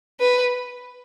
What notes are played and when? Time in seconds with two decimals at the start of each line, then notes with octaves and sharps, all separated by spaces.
0.20 B4